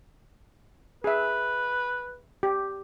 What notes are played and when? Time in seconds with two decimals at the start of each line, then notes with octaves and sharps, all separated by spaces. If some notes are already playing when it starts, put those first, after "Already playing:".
1.04 G#4 B4 E5
2.43 G4